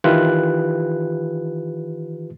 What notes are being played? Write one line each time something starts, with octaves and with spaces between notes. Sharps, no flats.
D#3 E3 F4 G4 B4 F#6